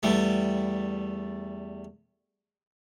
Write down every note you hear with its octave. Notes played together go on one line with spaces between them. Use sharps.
E2 G3 A3